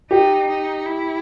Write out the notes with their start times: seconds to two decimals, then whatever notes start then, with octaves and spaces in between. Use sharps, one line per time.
0.11 D#4 G4
0.48 D#4
0.85 E4